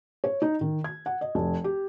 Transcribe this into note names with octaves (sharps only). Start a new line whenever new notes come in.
C#5
D#4
D#3
G#6
F#5
D#5
F1
G4